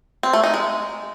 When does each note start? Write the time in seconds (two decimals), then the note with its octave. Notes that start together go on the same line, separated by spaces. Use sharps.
0.23 C4
0.33 A3
0.44 D#4
0.54 G#3